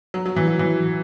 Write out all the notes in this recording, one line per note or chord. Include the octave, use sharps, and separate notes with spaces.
F#3
F#3
E3
F#3
E3